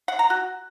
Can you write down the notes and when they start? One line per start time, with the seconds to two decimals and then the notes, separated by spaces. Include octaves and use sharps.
0.08 F#5
0.19 A#5
0.30 F#4